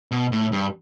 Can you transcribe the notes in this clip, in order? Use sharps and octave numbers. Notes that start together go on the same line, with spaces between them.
B2
A2
G2